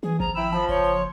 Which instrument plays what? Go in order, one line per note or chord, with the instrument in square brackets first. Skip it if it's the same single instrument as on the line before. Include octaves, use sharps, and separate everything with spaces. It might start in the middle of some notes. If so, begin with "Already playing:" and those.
[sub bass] E3 [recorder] G#4
[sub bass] G#1 [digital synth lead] F3 [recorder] A#5
[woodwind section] E4 G5 E6 [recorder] B5
[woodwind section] F3 [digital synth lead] A5
[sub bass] F#1 [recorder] C#5 [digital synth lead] C6
[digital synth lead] C6